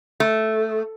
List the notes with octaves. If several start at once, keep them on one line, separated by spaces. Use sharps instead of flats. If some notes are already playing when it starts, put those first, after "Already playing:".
A3